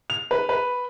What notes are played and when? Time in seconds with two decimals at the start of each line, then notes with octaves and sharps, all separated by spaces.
0.10 F7
0.31 B4
0.49 B4